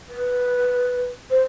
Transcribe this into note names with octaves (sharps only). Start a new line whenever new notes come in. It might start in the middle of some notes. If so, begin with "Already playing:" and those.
B4
C5